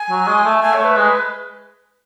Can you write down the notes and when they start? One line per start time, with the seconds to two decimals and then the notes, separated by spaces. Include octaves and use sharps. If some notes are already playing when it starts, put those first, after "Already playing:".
Already playing: G#5
0.10 F#3
0.28 G#3
0.44 A3
0.62 A3 G#5
0.73 C#5
0.79 A3
0.84 B4
0.96 G#3